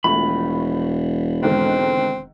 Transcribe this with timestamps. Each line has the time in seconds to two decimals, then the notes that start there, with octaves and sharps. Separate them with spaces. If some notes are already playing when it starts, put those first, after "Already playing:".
0.04 E1 A#1 A3 B5
1.43 G#2 D3 D#3 C4